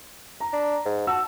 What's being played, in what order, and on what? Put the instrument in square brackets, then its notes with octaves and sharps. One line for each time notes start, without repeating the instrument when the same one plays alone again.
[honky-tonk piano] A#5
[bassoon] D4
G#2
[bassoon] F#4 [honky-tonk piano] A5 E6